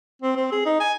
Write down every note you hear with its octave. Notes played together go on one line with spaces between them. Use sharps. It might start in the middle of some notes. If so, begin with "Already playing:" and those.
C4
C4
G#4
D#4
G#5